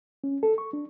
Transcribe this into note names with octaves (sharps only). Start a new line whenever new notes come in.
C#4
A4
C#6
D4